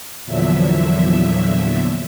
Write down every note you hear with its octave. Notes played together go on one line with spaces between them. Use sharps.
E2 A#2 D3 F3 F#3 E5